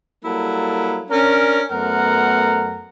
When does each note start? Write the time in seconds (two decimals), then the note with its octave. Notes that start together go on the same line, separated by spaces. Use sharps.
0.24 F#3 G3 A#3 E4 A4
1.10 C#4 D4 A#4
1.71 F#2 A3 B3 A#4 F#5 A#5